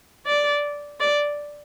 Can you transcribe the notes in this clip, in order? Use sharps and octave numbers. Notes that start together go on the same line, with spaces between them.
D5
D5